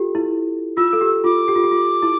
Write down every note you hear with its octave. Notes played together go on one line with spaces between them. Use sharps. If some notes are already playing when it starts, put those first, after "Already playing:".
Already playing: F4 G4 A4
E4
F4 E6
A4
G4
F4 D6
G4
F4
G4
F4
E4